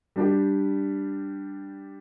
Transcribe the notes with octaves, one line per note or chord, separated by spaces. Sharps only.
G3 D4 G4